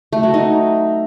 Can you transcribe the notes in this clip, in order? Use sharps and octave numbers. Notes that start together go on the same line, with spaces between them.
A3
F#3
D#4